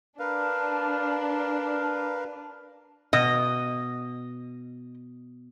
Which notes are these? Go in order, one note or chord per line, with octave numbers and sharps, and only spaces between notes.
D4 A#4 B4 F5
B2 D#5